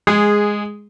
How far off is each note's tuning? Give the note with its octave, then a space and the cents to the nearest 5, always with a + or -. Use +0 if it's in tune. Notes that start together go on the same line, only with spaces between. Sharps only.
G#3 +0 G#4 -10